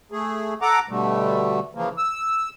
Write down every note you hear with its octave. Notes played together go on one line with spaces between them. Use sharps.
A3 G#4
A4 F#5 A#5 D6
B2 D3 G3 A3
C#3 E3 F3 A#3
E6